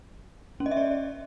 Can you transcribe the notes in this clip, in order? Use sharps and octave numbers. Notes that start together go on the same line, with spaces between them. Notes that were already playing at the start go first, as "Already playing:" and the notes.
C#4
D#5
E5
D5